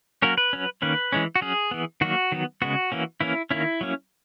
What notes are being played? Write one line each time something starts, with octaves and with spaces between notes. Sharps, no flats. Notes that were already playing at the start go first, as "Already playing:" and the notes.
F#3 A#3 C#4 A#4
B4
F#3 C#4
D#3 A#3 C#4 B4
E3 G#3 C#4
F#4
F#3 C#4 G#4
E3 B3
D#3 F#3 A#3 F#4
D#3 F#3 B3
C#3 G#3 B3 F#4
E3 A#3 C#4
E3 A#3 C#4 E4
D#3 A#3 C#4 E4
F#3 A#3 C#4